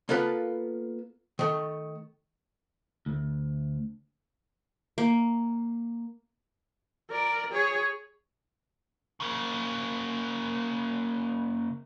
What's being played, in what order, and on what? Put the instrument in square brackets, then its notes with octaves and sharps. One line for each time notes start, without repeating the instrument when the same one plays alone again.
[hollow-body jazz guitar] A#3 B3 F4 A4 B4
D#3 A3
[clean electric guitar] D2
[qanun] A#3
[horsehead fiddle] A#4 D5
G#4 C#5
[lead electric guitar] C#3 A#3